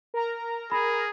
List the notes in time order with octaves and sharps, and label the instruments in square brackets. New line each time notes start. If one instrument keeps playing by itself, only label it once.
[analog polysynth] A#4 A#5
[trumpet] G#4 [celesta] B5